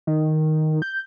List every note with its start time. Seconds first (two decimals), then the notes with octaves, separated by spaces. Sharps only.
0.07 D#3
0.82 G6